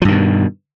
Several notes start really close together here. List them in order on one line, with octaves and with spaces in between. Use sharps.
F3 G2 D#3 B2